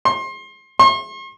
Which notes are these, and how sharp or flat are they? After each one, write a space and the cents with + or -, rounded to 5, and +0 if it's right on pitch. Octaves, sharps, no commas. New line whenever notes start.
C6 +30
C6 +45